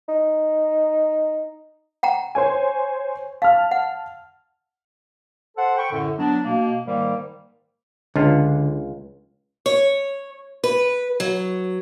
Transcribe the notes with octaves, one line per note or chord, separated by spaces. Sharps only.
D#4
F#5 G5 A#5
C5 C#5 G#5
F5 A5 F6
F#5
A4 C5 F#5
G5 B5 C#6
F#2 A2 D3
F#3 B3 D4
B2 A#3
G#2 D#3 G3 A#3
C#2 D3 F4 E5
C#5
B4
F#3